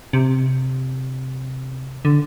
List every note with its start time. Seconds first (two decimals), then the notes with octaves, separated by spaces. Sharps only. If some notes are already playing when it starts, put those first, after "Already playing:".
0.13 C3
2.05 D3